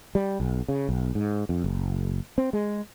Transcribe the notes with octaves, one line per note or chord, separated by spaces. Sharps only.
G3
B1
C#3
B1
G#2
F2
F#1
C4
G#3